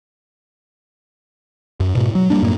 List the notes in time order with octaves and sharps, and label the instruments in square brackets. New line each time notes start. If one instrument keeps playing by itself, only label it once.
[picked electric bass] F#2
G#2 B2
F#3
G3 A#3 D4
F#2 A2 A#3